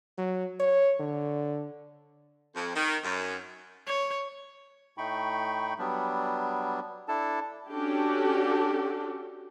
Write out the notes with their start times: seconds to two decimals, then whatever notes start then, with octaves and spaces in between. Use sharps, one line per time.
0.18 F#3
0.59 C#5
1.00 D3
2.55 F2
2.75 D#3
3.03 F#2
3.87 C#5
4.98 A2 A3 D#4 G5 B5 C#6
5.79 F#3 G3 B3 D4
7.08 D4 E4 A4 A5
7.70 C#4 D4 F#4 G4 A4